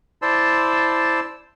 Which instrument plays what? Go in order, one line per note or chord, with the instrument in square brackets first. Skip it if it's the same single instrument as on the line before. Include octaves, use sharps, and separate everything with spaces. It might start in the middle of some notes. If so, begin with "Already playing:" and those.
[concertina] E4 C5 D5 A5 C6 E6